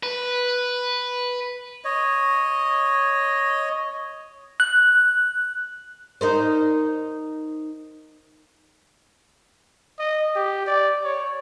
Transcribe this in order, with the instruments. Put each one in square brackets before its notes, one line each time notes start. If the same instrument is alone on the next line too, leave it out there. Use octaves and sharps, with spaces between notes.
[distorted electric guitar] B4
[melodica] C#5 D#5
[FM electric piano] F#6
[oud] D#4 A#4 C5
[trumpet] D#5
G4
D5
C#5